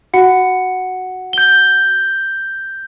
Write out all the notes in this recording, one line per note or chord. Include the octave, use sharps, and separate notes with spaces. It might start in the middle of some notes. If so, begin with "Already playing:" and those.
F#4 F#5 C#7
G6 G7